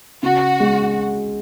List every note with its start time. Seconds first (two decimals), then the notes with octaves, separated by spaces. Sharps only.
0.23 C#3 F#4
0.60 G#3